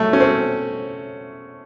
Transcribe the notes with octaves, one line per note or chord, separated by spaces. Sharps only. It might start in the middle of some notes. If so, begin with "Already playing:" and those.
Already playing: F#3 A3
C#4
C4